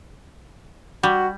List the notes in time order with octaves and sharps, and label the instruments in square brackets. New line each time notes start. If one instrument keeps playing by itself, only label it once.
[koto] G3 [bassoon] F#4